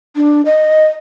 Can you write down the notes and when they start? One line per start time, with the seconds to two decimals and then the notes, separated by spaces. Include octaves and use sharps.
0.16 D4
0.46 D#5